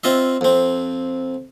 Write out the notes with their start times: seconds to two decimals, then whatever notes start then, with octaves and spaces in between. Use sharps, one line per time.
0.04 C4 F4 D#5 E5
0.41 F2 C4